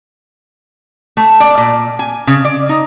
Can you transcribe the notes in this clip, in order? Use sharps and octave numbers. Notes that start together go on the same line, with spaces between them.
A3
D5
A#2
G#5
C#3
D5
D#4